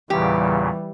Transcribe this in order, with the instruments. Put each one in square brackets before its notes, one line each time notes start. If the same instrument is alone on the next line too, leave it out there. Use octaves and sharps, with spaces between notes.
[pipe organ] E2 A#2 C#3 [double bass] E3 G3 [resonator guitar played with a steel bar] G4